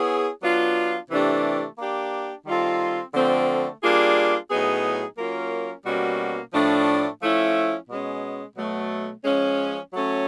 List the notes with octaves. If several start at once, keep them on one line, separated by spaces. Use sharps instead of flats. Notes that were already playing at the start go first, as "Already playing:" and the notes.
Already playing: B3 E4 G#4 C#5
F#3 B3 D4 F4
C3 E3 A3 D4 G4
A#3 D4 G4
D#3 G3 C4 F4 A4
D3 F3 A3 C4
G3 A#3 D4 F4 G#4
A2 F#3 B3 D#4 G#4
F#3 A#3 C#4 F4 A#4
B2 G3 A#3 C#4 F#4
A2 F3 A3 D4
F3 A3 C#4 E4
B2 G#3 C#4
B2 F#3 A3
F3 G#3 C#4
F#3 A3 C#4